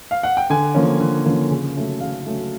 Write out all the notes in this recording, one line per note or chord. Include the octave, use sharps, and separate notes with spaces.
F5
F#5
G5
D3 G#5
F3 A#3 C#4
D3
F3 A#3 C#4
C#3
F#3 A3 C#4
C#3 F5
F#3 A3 C#4